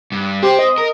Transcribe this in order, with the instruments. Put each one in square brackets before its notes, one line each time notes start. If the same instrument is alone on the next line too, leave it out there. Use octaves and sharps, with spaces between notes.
[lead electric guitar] G2
[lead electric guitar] C4 C5 [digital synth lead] G4
[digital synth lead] D#5
[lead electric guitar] A#4